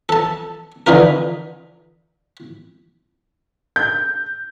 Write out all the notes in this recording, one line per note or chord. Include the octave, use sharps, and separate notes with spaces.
A4 A5
D3 E3 D#4 F4 A#4
G6